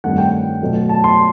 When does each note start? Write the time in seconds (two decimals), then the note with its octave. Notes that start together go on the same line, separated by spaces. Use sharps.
0.04 G2 D#3 A3 C4 F#5
0.18 G5
0.62 B2 F#3 A3
0.89 A5
1.04 C6